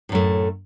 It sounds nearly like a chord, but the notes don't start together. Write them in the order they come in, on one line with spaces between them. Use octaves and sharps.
A2 F#2 A3